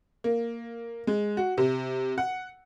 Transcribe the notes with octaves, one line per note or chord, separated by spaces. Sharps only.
A#3
G#3
F#4
C3
F#5